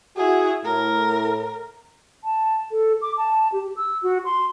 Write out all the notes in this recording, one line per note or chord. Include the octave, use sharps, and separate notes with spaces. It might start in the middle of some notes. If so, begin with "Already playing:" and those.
E4 F#4 G#4
A2 A#4
A5
A4
D6
A5
G4
E6
F#4
C6